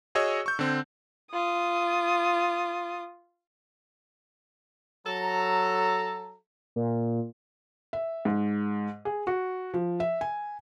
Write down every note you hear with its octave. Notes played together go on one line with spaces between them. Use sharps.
F#4 G#4 C#5 D#5 C#6 E6
C#6 G6
D3 C4
F4 D#6
F#3 A4 A#5
A#2
E5
G#2
G#4
F#4
F3
E5
G#5